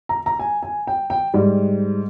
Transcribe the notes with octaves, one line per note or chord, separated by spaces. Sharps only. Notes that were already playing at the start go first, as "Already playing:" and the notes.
A#5
A#5
G#5
G#5
G5
G5
G#2 G3